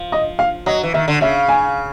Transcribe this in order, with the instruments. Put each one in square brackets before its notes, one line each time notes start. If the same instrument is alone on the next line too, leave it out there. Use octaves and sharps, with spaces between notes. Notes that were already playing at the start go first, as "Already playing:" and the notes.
Already playing: [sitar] F3
[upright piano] D#5
F5
[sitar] F#3 [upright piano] D#5
[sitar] E3
[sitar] D#3 [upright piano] E5
[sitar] D3
[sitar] C#3 [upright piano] E5
[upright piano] G#5